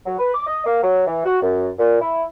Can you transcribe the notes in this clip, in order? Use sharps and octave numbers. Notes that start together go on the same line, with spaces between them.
F#3
B4
D6
D#5
A#3
F#3
E3
F#4
F#2
A#2
E4